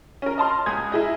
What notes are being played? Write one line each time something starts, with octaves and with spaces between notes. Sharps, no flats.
C#4 A#4
D#5 A5 C6 F6
C#2 G#5 D#6 G#6
E4 G#4 D#5